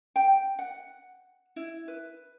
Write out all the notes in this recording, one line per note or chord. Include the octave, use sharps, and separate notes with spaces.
G5
F#5
E4
B4